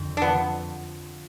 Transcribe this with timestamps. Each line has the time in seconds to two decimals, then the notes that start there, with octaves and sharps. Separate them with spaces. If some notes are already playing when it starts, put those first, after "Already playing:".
Already playing: F2 D3
0.17 D4
0.22 F3 B3